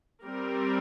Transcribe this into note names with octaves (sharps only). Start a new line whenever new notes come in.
G3 C4 A#4